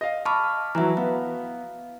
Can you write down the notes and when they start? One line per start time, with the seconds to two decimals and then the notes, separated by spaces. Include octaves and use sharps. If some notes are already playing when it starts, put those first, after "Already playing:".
0.01 D#5 F5
0.25 A5 B5 C#6 D6 F6
0.75 E3 F#3 E5 A#5
0.97 B3 F5